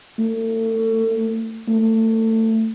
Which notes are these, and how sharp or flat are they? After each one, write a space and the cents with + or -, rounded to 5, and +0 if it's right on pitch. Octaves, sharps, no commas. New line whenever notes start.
A3 +35
A3 +25